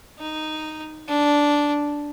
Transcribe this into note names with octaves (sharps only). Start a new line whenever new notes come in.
D#4
D4